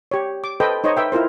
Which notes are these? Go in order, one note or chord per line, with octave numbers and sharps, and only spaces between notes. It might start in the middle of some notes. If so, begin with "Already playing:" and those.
G4 C#5
D6
A4 B4 C5 D#5 G5
D#4 C5 C#5 D#5
B4 E5 G5
E4 F4 A#4 C5